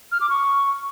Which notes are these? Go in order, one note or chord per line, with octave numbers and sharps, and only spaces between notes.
F6
D6
C#6